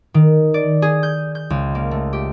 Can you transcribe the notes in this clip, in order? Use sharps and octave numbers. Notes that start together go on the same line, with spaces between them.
D#3
D5
G#4
G6
G6
C#2
A#3
A3
G4